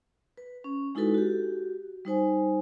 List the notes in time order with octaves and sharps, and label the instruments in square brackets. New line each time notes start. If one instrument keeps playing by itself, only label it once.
[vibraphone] B4
C#4
G#3 D#4 E4 F#4 A4 B4
F#4 G4
G3 D#4 C5 G#5